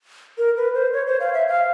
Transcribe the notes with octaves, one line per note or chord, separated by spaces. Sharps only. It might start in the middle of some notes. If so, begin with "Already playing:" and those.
A#4
B4
C5
C#5
C5
F5
E5
F5